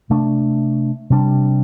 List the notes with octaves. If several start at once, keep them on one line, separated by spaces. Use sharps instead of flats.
C3 A3 D4
C3 G3 D4